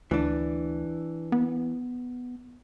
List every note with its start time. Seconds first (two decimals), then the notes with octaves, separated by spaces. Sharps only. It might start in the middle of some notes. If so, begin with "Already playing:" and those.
0.11 D2 E3 D4
1.32 B3